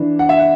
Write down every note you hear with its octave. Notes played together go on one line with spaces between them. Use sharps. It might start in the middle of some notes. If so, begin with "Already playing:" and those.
Already playing: E3 D4
F#5
E5
F#5